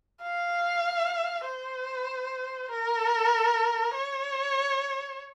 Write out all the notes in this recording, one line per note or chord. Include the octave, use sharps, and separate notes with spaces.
F5
C5
A#4
C#5